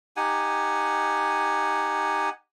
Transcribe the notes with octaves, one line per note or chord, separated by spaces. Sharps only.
D#4 G4 F#5 G#5